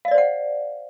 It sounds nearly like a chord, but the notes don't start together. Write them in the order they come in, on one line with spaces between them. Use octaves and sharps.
F5 D#5 D5 C5 F#5